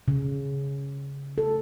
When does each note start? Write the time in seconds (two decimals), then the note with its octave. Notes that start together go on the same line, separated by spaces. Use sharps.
0.08 C#3
1.38 A4